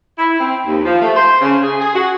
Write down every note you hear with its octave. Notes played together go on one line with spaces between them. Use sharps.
E4
C4
D#2
F3
A3
C5
C#3
G#4
G#4
F#4